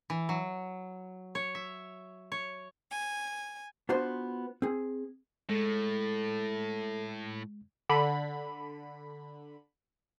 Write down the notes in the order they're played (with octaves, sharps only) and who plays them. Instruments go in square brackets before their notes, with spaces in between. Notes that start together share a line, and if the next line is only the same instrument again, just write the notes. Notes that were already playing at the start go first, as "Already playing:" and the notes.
[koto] E3
F#3
C#5
E5
C#5
[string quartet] G#5
[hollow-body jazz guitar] B3 D4 F4 F#4 C5
C4 G#4
[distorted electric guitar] A2 [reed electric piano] G#3 [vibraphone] A4
[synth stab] D3 B5